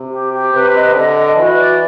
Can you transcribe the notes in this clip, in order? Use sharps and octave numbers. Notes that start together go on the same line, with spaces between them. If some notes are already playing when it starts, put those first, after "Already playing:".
Already playing: C3
G4
G4
C3 B4
D#5
D3 D#5
D#5
E3 F#4
D5